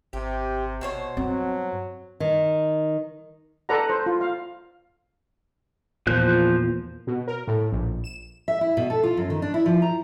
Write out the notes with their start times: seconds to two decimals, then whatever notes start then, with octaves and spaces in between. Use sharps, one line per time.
0.13 G#1 C3 G4
0.81 B2 C5 C#5
1.17 G2 F#3 C4
2.20 D#3
3.69 A4 B4 D5 F#5 A#5
3.90 C5
4.06 F4
4.21 F5
6.07 E2 A#2 F3 C5 F#6
7.07 B2
7.28 A#4
7.48 A2
7.72 A#1
8.04 E7
8.48 E5
8.61 E4
8.77 B2
8.90 A4
9.03 F4
9.17 F#2
9.30 D#3
9.42 D4
9.54 E4
9.66 F3
9.82 A#5